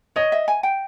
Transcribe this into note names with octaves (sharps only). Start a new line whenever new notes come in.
C#5 D#5
E5
G#5
G5